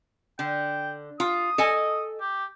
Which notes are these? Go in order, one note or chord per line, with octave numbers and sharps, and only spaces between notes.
D3 G5
F4 D#6
A4 D#5 G#5
G4